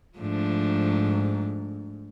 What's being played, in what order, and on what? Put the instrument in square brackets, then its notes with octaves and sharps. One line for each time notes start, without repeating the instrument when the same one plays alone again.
[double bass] G#2 [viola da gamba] F3 A3 D4